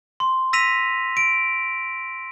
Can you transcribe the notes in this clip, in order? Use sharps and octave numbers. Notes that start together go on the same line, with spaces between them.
C6
E6 A#6 B6 D#7 F7
D7